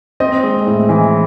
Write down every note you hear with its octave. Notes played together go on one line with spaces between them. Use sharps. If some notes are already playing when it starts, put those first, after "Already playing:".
C4 D#5
G#3
A2
E3